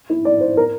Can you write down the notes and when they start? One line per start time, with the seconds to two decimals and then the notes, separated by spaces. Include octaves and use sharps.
0.10 E4
0.25 D5
0.41 C5
0.57 A#4